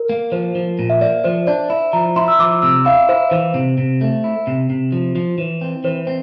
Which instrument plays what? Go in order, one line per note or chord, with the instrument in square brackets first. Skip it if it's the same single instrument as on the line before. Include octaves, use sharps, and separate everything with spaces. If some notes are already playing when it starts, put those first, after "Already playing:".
Already playing: [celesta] A#4
[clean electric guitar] A#3
[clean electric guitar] F3 [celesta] C5
[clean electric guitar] F3
A#2
[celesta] E5
[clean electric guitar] A#3 [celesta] D5
[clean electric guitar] F3 [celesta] C5
[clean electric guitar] D4 [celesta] D5
[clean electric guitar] E4
[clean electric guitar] F3 [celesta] A#5
[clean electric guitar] E4 [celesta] C6
[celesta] E6
[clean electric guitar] F3 [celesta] D6
[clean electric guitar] C3 [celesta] E6
[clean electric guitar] E4 [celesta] F5
[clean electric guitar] E4 [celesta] C5
[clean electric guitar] E3 [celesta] C5
[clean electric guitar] C3
C3
A3
E4
C3
C3
F3
F3
[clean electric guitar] E3 [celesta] C5
[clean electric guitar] C4
[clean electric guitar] E3 [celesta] C5
[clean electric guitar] C4